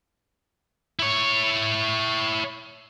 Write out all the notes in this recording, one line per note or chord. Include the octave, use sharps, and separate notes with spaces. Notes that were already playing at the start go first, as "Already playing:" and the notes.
E4 C#5